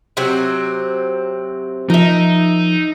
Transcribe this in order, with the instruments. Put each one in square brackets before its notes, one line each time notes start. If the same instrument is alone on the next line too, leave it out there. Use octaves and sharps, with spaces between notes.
[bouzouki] C3 F#3 C4
[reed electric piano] F3 [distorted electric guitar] D#4 [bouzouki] A#4 E5